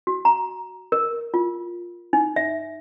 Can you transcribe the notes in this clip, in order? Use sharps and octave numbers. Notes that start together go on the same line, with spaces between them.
F#4
A#5
A#4
F4
D#4
E5